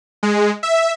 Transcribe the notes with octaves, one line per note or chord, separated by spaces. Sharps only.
G#3
E5